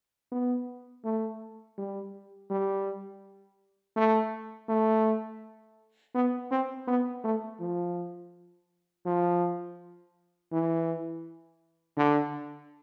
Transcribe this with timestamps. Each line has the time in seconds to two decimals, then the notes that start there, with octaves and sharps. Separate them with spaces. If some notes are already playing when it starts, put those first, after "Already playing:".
0.32 B3
1.05 A3
1.78 G3
2.51 G3
3.96 A3
4.69 A3
6.15 B3
6.51 C4
6.88 B3
7.24 A3
7.60 F3
9.06 F3
10.52 E3
11.97 D3